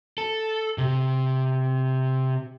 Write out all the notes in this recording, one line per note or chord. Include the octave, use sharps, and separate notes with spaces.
A4
C3